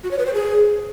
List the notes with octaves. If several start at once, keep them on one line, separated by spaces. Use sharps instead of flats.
F#4
C#5
B4
C5
G#4